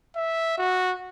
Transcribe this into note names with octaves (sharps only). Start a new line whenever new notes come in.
E5
F#4